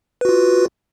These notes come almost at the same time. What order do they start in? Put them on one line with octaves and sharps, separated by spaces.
B4 F#4 F4